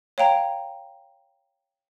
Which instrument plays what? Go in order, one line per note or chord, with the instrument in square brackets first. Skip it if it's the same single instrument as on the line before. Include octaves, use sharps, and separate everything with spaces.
[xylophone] C#5 F5 G5 A#5